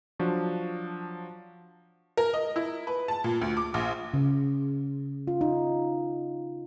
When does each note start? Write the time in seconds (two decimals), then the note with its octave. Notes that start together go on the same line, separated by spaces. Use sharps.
0.19 F3 F#3 D4 F#4
2.17 A#4
2.34 D#5
2.56 E4
2.87 B4
3.08 A5
3.24 A#2
3.41 D2
3.57 D6
3.74 A#1
4.14 C#3
5.27 F4
5.41 D#4